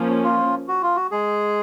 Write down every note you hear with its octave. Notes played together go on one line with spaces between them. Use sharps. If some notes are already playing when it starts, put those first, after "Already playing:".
Already playing: F3 A#3 C#4
F4
F#4
F4
F#4
G#3 G#4